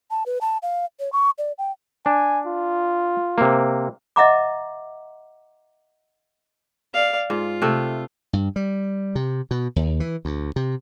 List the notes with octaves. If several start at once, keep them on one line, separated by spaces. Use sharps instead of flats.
A5
B4
A5
F5
C#5
C#6
D5
G5
D4 G#5
F4
C3 A#3
D#5 E5 F#5 A#5 D6
D5 F5
G#2 F4
C3 A3
G2
G3
C3
B2
D#2
E3
D2
C3